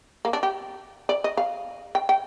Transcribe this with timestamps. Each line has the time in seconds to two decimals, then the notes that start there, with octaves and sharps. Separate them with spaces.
0.25 A#3
0.33 D4
0.43 G4
1.09 D5
1.24 D#5
1.37 F5
1.95 G5
2.09 G5